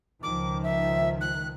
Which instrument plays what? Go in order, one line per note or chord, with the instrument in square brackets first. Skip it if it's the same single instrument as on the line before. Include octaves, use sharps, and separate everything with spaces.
[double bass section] C#2 D#3 F3 [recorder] D6
[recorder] E5
F#6